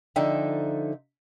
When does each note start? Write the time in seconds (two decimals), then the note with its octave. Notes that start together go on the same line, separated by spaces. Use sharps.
0.16 D3 F3 D#4 A4 E5 G5